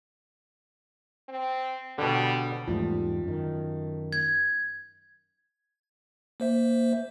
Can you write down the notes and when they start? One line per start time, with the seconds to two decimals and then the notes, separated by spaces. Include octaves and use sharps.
1.29 C4
1.98 B2 D3 G3
2.67 E2 G#2 F3 G3 A3
3.24 F#2 D#3
4.13 G#6
6.40 A#3 C5 E5